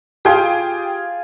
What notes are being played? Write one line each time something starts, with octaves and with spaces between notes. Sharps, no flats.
F4 G4 G#4 F5 G5